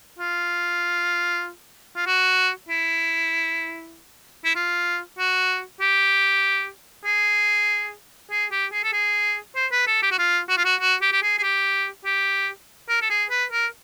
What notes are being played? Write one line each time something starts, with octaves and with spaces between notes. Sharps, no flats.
F4
F4
F#4
E4
E4
F4
F#4
G4
G#4
G#4
G4
G#4
A4
G#4
C5
B4
A4
G4
F#4
F4
F#4
F4
F#4
F#4
G4
G4
G#4
G#4
G4
G4
A#4
A4
G#4
B4
A#4